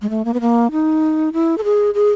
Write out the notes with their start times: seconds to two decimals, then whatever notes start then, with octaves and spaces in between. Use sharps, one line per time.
0.02 G#3
0.10 A3
0.25 A#3
0.34 B3
0.41 A#3
0.71 D#4
1.33 E4
1.58 A4
1.64 G#4
1.94 G#4